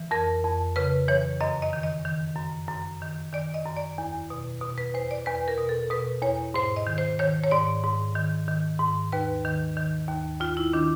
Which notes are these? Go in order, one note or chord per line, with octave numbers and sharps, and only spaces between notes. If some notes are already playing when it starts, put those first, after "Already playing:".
Already playing: E3
F2 A#4
F2
C#3 B4
E3 C#5
F#2 D#5
D#5
D#3
D#5
D#3
F#2
F#2
D#3
D#3 D5
D#5
F#2
D5
E2
B2
B2
B4
E2 C5
D5
E2 B4
A#4
B2
A4
B2 B4
E2 C#5
G#2 C5
D#5
D#3
C5
D#3 C#5
C#5
G#2 D5
G#2
D#3
D#3
G#2
D#2 B4
D#3
D#3
D#2
D#2 F4
E4
D#3 D4